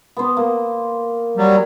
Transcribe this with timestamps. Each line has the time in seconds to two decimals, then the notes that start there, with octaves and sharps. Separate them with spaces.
0.17 B3 C5
0.37 A#3
1.37 F#3 G3